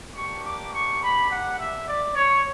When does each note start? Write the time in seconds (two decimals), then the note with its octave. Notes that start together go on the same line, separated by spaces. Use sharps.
0.11 A#3 D4 G4 C#6
0.41 D6
0.70 C#6
0.99 B5
1.28 F#5
1.56 E5
1.85 D5
2.14 C#5